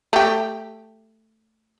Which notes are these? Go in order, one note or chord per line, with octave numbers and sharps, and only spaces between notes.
A3 G4